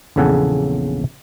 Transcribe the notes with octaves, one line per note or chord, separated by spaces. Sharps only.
A#1 E2 C#3 A4 F#5 G#5